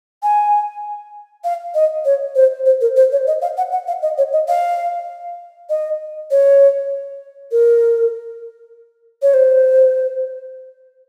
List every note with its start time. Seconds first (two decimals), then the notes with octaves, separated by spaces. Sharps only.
0.23 G#5
1.44 F5
1.75 D#5
2.05 C#5
2.35 C5
2.66 C5
2.81 A#4
2.96 C5
3.12 C#5
3.27 D#5
3.42 F5
3.57 F#5
3.72 F#5
3.88 F5
4.02 D#5
4.18 C#5
4.33 D#5
4.48 F5
5.70 D#5
6.31 C#5
7.52 A#4
9.22 C#5
9.34 C5